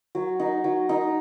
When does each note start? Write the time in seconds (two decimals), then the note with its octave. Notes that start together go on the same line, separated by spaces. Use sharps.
0.15 F#3
0.40 D#4
0.64 F#3
0.89 D#4